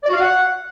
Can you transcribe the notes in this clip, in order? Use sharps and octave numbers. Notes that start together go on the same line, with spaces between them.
D5
F#4
F5
F#5